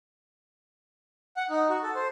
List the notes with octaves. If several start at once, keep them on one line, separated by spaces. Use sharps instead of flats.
F#5
D#4
F#4
A4
C5